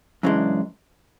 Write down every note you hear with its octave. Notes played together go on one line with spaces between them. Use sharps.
F#2 C#3 E3 G#3 D4